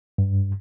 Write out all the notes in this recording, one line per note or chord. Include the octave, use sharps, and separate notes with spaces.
G2